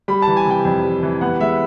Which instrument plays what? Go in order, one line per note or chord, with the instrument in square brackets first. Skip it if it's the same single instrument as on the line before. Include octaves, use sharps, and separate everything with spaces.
[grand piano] G3 B5
E3 A5
G#5
C3 G5
F2
G3
E3
B3 F#5
G#3 E5